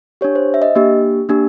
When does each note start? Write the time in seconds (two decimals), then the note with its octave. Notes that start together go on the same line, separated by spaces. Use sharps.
0.21 D4 G4 C#5
0.35 C5
0.54 E5
0.62 D#5
0.75 A#3 D4 G4
1.29 A#3 D4 G4